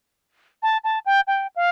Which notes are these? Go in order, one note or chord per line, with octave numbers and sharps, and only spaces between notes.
A5
A5
G5
G5
F5